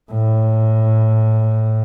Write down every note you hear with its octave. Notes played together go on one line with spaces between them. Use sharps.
A2